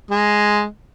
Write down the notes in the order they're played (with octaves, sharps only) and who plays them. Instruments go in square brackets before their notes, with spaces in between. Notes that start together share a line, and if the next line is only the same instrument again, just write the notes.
[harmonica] G#3